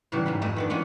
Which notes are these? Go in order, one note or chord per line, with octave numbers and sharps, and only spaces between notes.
A2 C#3 E3 F#3 G3
G#2 G3 B5
F2 G#3 A3 E5
D#3 B3 D4
E3 G#3 B3 C#4 F4